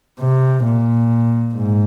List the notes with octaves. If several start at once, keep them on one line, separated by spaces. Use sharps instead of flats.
C3
A#2
G#2